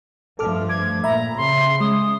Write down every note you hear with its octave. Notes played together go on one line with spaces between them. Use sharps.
G2 F3 A3 A4 D6 F6
D6 G#6
A#2 E5 A#5 B5
C#3 C6
G#3 D#6